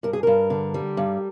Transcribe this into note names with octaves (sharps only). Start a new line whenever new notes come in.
G2 A#4
G#4
G2 A#4
D3
G3
G2